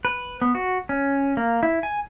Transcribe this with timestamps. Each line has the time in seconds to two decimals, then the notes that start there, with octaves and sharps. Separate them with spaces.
0.05 B4
0.42 B3
0.55 F#4
0.89 C#4
1.37 A#3
1.63 E4
1.83 G#5